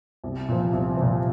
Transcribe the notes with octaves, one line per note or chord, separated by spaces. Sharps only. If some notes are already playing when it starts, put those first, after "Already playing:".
C2
A#2 F3
C2
A#2 F3